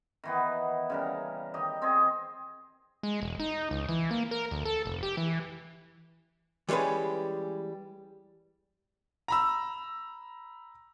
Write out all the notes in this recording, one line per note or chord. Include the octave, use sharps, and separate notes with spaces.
D#3 E3 B3
C#3 G3 A#4
D#3 G4 D#5
C4 G#4 D#5
G#3
E1
D#4
C#2
E3
A#3
A#4
D2
A4
F1
G4
E3
E3 G3 G#3 C#4 B4
A#5 B5 E6